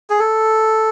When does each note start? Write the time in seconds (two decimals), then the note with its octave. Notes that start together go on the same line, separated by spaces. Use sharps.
0.10 G#4
0.19 A4